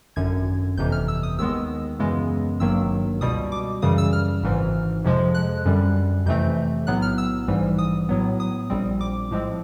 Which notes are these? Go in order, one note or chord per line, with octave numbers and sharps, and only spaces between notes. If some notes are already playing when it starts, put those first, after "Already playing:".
G#1 F#2 D3 G#6
G1 F2 C3 E3 G6
F6
E6
D#6
D#2 D#3 G#3 B3 E6
F#2 C#3 E3 G#3 B3
G#1 G2 D#3 F#3 A#3 E6
C#2 B2 G3 D#6
D6
F#2 C#3 E3 G3 D#6
E6
F6
G#1 G#2 E3
F2 C3 F3 G#3
F#6
F#2 D3 G3
F2 C3 E3 A3 C4 G6
B1 A2 F#3 B3 F#6
F6
E6
A#1 G#2 E3 G3
D#6
A2 F#3 B3
D#6
A#1 A#2 G3 C4
D6
A2 F3 G#3 C4